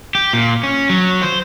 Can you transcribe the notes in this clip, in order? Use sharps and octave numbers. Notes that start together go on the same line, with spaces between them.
G4
A#2
C#4
F#3
C5